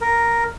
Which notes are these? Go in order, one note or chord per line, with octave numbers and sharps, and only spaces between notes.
A#4